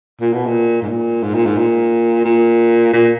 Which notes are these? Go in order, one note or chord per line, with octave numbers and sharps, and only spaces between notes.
A#2
B2
A#2
G#2
A#2
G#2
A#2
G#2
A#2
A#2
A#2